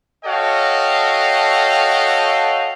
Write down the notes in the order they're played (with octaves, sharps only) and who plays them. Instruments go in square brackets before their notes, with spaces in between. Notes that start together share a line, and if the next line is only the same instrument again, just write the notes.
[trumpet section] F#4 A4 C#5 D#5 F5 G5